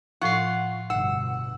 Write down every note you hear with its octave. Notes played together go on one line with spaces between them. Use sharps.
A2 F3 F4 F#5 C#6 C7
G1 B2 F#5 E6